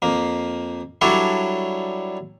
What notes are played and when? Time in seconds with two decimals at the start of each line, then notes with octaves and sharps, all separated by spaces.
0.02 F2 A#3
1.01 F#3 G3 D4 E4 A4 C#5